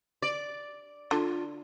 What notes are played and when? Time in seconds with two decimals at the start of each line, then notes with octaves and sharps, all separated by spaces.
0.22 D5
1.11 D3 F4